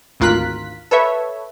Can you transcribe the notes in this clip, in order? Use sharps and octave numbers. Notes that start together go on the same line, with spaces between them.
G#1 D2 F4 A#4 F#6 B6
A4 B4 C#5 E5